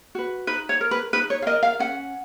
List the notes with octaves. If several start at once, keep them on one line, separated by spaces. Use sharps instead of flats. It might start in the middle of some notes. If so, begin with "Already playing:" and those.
F#4 B4
D#4 B4
C#5
A#4
B4
D#4 B4
C#5
F5
A#4 D#5
F5
C#4 F#5